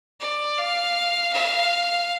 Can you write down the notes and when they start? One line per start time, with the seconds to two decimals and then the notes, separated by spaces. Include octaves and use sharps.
0.21 D5
0.58 F5
1.33 F5